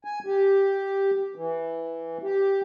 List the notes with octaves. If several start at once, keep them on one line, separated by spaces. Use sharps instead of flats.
G#5
G4
E3
G4